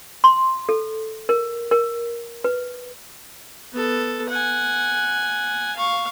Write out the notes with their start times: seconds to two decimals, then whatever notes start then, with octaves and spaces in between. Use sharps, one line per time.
0.24 C6
0.69 A4
1.29 A#4
1.71 A#4
2.44 B4
3.72 B3 A4
4.30 F#5 G#5
5.75 F5 C#6